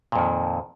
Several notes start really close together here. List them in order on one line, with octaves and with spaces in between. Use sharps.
A#2 F2 D#3